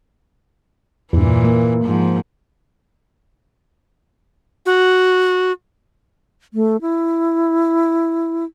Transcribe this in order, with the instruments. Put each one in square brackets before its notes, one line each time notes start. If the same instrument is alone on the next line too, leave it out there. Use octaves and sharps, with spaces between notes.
[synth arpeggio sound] E2 G2 [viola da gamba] A#2 E3
[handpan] A#3
[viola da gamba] G#2 F3
[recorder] F#4
[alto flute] A3
E4